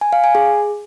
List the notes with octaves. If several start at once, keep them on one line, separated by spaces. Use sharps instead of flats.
G#5
F5
G#5
G#4